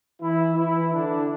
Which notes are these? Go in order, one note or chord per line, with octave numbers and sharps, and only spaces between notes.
E3 E4
E3 E4
D3 D4